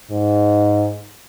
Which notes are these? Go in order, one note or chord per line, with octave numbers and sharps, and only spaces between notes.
G#2